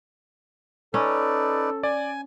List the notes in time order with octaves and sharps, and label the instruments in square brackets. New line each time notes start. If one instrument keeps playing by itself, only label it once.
[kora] C#4 [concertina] D#4 B4 D5 [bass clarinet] A4
[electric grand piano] D5 [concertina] G#5